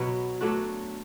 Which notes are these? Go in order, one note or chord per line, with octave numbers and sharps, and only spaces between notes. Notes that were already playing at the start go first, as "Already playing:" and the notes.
Already playing: B2 F#3 B3
F#3 A3 D4 F#4